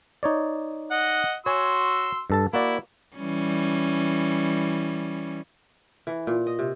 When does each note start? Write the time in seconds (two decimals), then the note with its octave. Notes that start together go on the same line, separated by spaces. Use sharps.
0.23 D#4 C#5 D5
0.91 D#5 F#5
1.46 F#4 C#5 G#5 C6 E6
2.30 G2 A4 A5
2.53 A#3 E4 F#4 D5
3.17 E3 G3 C#4
6.07 E3
6.27 A#2
6.47 D#5
6.59 C3